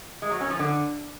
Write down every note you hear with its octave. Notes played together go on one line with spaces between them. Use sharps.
G#3
F#3
C#4
F3
D3